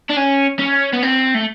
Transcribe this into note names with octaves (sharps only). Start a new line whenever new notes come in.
D4
C#4
C#4
B3
C4
A3